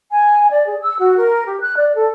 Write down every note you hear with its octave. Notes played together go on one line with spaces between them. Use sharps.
G#5
D5
G#4
E6
F#4
A#4
G4
F#6
D5
A4